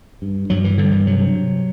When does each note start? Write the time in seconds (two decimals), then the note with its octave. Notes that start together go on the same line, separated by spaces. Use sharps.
0.22 G2
0.50 G2 F#3
0.64 E3
0.78 G2 D3
0.91 E3
1.07 C3 F#3
1.35 C3